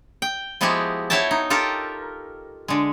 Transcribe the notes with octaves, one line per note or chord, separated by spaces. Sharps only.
G5
F3 G#3 B3 E4 F#4 G4
E4 F#4 C#5 E5 G5 A5
D#4
F4 G4 A4 A#4
D3 G#3